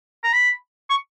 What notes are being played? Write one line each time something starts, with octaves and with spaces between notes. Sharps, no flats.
A#5
B5
C#6